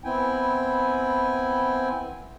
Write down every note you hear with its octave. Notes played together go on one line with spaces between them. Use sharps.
B3 C4 E4 G5 G#5